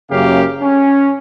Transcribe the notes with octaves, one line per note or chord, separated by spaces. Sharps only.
F#1 F#2 C#3 A#3 G4 F5
C#4